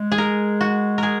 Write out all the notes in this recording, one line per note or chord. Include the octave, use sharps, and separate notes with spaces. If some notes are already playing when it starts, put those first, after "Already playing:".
Already playing: G#3
G#4
A#4
F#4
G#4 A#4